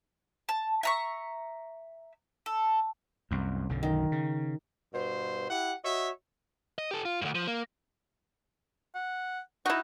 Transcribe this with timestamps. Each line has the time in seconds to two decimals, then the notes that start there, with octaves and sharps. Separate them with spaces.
0.49 A5
0.83 E5 A#5 C#6
2.46 A4
3.31 C2 F#2
3.69 B1 F#2 D3
3.83 D#3
4.12 C#3
4.92 G2 B2 C5
5.49 E4 G4 F#5
5.83 F#4 C#5 D#5 E5
6.78 D#5
6.91 G4 A4
7.05 F4
7.22 D2 G2
7.35 F3
7.47 A#3
8.95 F#5
9.66 D#4 E4 F#4